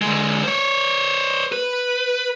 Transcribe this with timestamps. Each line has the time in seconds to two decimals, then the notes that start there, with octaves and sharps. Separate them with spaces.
0.01 D3 G#3
0.43 C5 C#5
1.52 B4